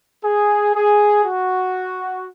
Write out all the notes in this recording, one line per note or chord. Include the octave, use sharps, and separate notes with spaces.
G#4
G#4
F#4